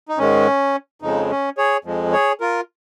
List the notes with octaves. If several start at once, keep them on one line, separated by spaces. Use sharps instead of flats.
D#4
G#2 D#3 G#3 C#4
F2 C#3 F3 G#3 D#4
C#4
G#4 C#5
F2 F3 G#3
G#4 C#5
F4 A#4